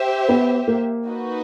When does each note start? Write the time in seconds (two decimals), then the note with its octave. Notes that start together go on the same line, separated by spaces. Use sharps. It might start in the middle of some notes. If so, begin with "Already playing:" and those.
Already playing: G4 C5 E5 G5
0.29 B3
0.68 A#3
1.06 D#4 F#4 B4